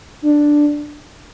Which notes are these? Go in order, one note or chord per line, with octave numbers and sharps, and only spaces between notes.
D4